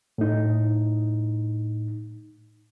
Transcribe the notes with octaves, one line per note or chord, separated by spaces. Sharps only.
A2 D#4